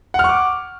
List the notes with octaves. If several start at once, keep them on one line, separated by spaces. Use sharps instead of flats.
F#5 C#6 D6 F6